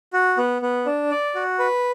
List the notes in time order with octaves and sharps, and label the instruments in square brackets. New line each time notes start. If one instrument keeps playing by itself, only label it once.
[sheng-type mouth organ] F#4
B3
B3
D4
D5
F#4
B4